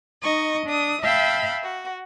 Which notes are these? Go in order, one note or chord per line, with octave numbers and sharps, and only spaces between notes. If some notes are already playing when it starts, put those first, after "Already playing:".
D#4 D#5 C#6
D4 D#6
E5 F5 G5 A5 B5
F#4